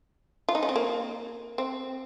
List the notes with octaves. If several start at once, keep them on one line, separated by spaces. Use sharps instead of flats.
F4
D#4
C#4
C4
A#3
C4